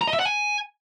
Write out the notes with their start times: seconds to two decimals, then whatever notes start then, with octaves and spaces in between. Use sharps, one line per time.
0.02 A#5
0.08 D#5
0.13 E5
0.19 F#5
0.25 G#5